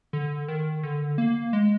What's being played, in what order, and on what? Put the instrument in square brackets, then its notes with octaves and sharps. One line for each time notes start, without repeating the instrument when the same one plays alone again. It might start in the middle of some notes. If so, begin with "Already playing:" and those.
[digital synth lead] D3
D#3
D3
A#3
G#3